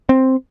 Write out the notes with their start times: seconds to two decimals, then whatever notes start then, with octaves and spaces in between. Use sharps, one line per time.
0.09 C4